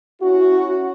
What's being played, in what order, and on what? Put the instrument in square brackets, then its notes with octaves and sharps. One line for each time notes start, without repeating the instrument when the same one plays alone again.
[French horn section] C#4 E4 F#4